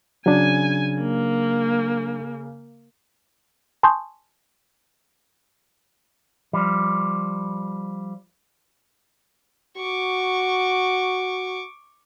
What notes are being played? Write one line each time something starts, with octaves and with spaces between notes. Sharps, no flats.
C#3 F#3 D4 G#5
A#3
G#5 A5 C6 C#6 D#6 G6
F3 G3
F#4 C#6 D6